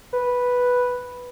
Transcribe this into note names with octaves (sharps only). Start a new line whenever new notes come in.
B4